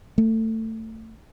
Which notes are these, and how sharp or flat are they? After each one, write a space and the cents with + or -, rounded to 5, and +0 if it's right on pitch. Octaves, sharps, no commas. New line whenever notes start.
A3 +20